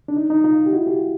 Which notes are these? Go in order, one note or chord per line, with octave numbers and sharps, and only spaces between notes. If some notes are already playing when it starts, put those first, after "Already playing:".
D4
D#4
D#4
D#4 F4
G4
E4 F#4
F4 G4